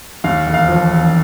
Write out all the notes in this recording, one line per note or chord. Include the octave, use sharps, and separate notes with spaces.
D#2 F5
E1
F5
F3
E1